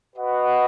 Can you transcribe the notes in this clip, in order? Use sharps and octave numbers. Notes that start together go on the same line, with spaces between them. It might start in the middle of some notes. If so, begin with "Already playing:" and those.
F#4 B4 D#5 F#5